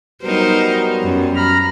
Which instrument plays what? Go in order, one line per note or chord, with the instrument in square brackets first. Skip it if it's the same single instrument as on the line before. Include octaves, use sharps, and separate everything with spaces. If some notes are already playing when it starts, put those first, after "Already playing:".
[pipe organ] F#3 G3 B3 [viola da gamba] D#4 A#4 C5
[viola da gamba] F#2
[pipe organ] A#5 B5 F6